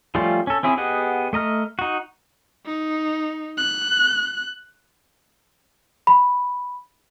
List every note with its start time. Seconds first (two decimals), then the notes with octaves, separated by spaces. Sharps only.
0.15 F3 G3 A3 C#4 F4
0.47 C#4 A4
0.63 C4 C#4 E4 G#4
0.77 B3 G4 G#4 D#5 F#5
1.33 A3 D#5 A#5 F6
1.79 D#4 F#4
2.66 D#4
3.58 F#6
6.07 B5